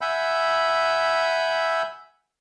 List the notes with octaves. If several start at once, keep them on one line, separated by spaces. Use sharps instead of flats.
E5 F#5 G#5 B5 E6 G6